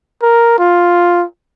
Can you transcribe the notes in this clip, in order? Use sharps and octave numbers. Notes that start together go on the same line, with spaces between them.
A#4
F4